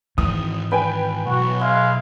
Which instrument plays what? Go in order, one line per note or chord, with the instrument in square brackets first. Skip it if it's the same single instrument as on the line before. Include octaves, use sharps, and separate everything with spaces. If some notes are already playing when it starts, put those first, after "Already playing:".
[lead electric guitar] G#2 D#3 [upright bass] E3 [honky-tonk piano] D#6
[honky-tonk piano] B4 G5 G#5
[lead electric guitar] B1 [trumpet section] F#4
[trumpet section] G#3 E4 F5